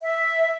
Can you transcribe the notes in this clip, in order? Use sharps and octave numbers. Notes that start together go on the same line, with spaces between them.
E5